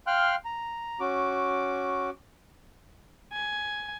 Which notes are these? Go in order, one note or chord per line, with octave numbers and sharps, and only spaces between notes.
F5 G5 C6 F6 F#6
A#5
C#4 F#4 D6
G#5